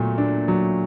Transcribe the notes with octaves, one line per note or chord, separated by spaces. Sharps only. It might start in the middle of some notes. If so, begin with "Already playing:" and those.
Already playing: A#2 F#3 A3
D4
F#3